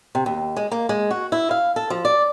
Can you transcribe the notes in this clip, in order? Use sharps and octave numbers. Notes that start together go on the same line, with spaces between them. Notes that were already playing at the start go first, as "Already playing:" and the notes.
C3
D#2
G#3
A#3
G#3
F#4
E4
F5
A4
F3
D5